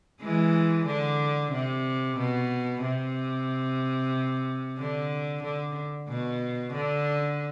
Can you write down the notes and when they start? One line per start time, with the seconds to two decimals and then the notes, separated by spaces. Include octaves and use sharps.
0.21 E3 G#3
0.86 D3
1.52 C3
2.18 B2
2.82 C3
4.79 D3
5.44 D3
6.09 B2
6.74 D3